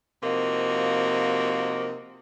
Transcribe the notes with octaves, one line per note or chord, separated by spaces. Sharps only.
C3 F3 A#3 D#4 F#4